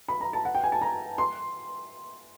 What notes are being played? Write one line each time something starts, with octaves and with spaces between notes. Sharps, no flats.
B5
A#5
A5
F#5
G5
G#5
A5
A#5
C6